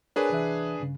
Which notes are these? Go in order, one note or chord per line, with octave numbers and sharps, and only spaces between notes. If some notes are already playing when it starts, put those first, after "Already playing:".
D4 G#4 A#4 B4 C#5 G#5
C2 E3 E5
G2 C#3